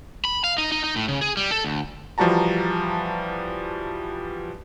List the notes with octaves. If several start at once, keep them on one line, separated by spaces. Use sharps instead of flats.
B5
F5
D#4
D#4
D#4
A2
C#3
G#4
G3
A4
D2
E3 F3 G3 F#4 A5 A#5